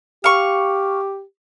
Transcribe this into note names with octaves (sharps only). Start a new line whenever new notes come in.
G4 F5 C#6